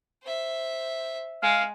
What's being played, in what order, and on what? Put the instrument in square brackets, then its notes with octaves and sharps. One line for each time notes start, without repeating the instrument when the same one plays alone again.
[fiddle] C5 E5
[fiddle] G#3 [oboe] F5